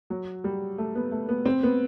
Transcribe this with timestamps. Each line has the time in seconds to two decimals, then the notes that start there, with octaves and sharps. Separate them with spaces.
0.10 F#3
0.44 G3
0.78 A3
0.95 B3
1.11 A3
1.29 B3
1.45 C4
1.63 B3